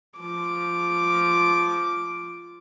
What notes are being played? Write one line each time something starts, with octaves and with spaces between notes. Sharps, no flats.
F3 D6